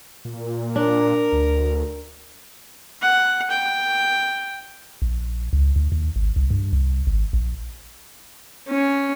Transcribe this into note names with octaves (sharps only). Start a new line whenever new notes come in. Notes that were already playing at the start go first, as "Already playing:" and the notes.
A#2
D4 A#4
D2
F#5
G5
A#1
C#2
D2
D#2
G#1
C2
G2
C2
G#1
A#1
C#4